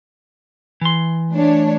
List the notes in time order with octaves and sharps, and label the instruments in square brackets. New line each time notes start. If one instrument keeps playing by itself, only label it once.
[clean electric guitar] E3 C6
[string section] A3 D4 C#5